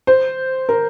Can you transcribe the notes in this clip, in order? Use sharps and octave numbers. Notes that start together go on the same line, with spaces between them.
C5
A#4